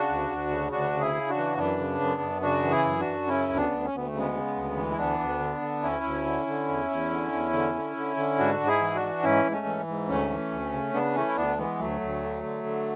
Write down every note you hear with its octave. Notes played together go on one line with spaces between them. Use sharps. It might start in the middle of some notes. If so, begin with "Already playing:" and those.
Already playing: C#3 D4 F#4
D2
D2
C#3
D2 D4 F#4
C#3
E4 G#4
C#3
D4 F#4
E3
F#2 B3 D4
C#3
F#2
F#2
C#3 D4 F#4
E3
E4 G#4
F#2
D4 F#4
F#2
C#3 C#4 E4
D2
B3 D4
D2
C#4
D2 B3
A3
C#3
G#3 B3
C#3
D2
E3
E4
D2 B3 D4
D2
D3
D3
D2 C#4 E4
D2
D3
D3
E2
E2
D3
E2
D3
D3
D3
D3
G#2 D4 F#4
G#2
E4 G#4
E3
D4 F#4
E3
G#2 C#4 E4
G#2
A3 C#4
E3
G#2
D2 A3 C#4
E3
D2
C#3
C#3 B3 D4
E3 A3 C#4
E4
D2 B3 D4
E3 G#3 B3
D2 F#3 A3
D2
D3
D3
D3